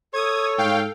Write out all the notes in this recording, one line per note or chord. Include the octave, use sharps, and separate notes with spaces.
A4 C#5 D#6 G#6
G#2 F5 G5